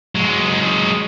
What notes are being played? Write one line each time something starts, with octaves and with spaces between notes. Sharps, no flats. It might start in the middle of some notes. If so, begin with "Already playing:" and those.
F#3 G#3